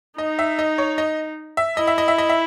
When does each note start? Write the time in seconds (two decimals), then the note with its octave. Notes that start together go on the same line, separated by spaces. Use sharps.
0.18 D#4 D#5
0.39 E5
0.59 D#5
0.78 C#5
0.98 D#5
1.57 E5
1.77 E4 D#5
1.87 E5
1.98 D#5
2.08 E5
2.18 D#5
2.29 E5